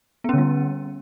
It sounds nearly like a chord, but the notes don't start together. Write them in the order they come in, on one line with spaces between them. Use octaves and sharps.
B3 C#4 D3 G3